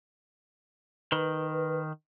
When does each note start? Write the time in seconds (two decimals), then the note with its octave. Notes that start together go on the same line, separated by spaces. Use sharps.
1.12 D#3 B4